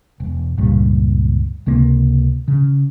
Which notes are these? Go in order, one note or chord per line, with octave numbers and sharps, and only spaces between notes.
E1
C#2 G2 A#2 G3
C#2 C3 A#3
C#3